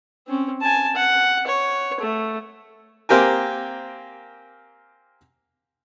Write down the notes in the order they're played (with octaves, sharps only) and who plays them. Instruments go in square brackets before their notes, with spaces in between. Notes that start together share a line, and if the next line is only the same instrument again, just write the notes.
[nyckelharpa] C4 C#4
G#5 A5
F#5
C#5
A3
[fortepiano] A#3 C4 G4 A#4 G#5